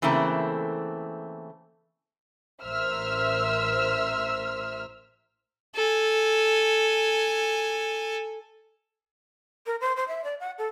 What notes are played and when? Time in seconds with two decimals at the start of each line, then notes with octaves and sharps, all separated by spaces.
0.02 C#3 E3 A3 A#3 C4
2.63 A1 A#4 C5 E5 E6 F6
5.75 A4 G#5
9.66 A#4
9.81 C5
9.96 C5
10.08 E5
10.24 D5
10.40 F#5
10.58 A4